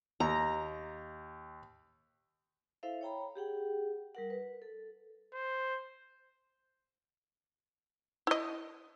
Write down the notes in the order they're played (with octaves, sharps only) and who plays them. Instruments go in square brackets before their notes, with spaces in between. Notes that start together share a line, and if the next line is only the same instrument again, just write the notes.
[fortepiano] D#2 [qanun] A#5
[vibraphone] E4 A4 C5 E5 F5
C#5 G5 A#5 B5
G4 G#4 F#5 G5
G3 A#4 F#5
B4
A4
[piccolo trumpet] C5
[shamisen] E4 D#5